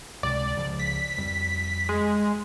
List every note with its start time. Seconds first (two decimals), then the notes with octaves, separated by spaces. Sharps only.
0.23 C#2 C3 D5
0.55 C#2 C#3 F3
0.79 B6
1.18 F2 G3
1.89 G#3